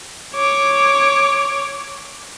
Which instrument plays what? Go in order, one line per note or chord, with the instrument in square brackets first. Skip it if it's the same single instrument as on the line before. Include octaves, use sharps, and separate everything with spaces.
[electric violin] C#5 D6